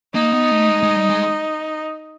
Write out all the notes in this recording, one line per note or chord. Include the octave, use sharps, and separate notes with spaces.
A#3 D#4
B3
A3
G#3
G#3
G3
G#3